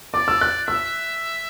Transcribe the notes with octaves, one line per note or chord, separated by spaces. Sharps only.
D5 D6
E6
F#6
E5 E6